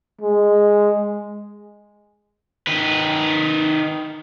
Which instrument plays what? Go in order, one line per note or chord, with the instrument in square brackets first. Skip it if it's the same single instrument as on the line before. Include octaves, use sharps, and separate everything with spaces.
[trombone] G#3
[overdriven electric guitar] D#3 B4